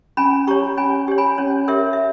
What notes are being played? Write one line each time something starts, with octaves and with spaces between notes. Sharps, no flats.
C#4 G#5 B5
G4 C#5 A#5 C#6
C#4 G#5 B5
G4 C#5
G#5 B5
C#4 C#5
G4 A#4 C#5 E5
E5